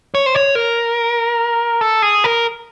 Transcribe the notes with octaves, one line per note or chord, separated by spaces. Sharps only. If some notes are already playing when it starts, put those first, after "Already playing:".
C#5
C5
C#5
A#4
A4
G#4
A#4